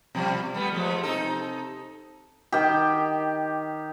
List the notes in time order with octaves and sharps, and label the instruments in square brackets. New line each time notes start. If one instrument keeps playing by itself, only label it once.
[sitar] B2 F3 G3
G3 A3 B3
F3 G#3 A3
C3 D#4 A4
[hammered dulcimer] D#3 G4